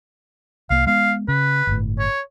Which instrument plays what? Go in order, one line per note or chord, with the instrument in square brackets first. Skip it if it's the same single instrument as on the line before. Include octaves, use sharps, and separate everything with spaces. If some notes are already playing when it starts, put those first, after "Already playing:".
[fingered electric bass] C2 A#3 [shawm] F5
[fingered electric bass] G#3 B3 [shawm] F5
[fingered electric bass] C#3 [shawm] B4
[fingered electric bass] G1 A2
[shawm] C#5